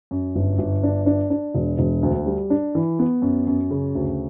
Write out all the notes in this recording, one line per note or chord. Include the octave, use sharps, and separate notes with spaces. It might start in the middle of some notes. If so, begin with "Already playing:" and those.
F#2
G1
G1
D4
D4
D4
E1
E1
D2
G3
D4
E3
B3
F#2
F#2
C#3
D2